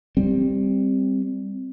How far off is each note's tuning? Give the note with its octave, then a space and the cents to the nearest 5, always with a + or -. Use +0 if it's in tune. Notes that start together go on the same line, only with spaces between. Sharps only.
G3 +10 C4 +0